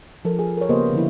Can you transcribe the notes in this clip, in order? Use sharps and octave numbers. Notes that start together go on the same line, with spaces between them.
F3 A4 A#4
G#4
A#4 C#5
C#3 A#3 B3 G4 C5 D#5
D3 F3 E4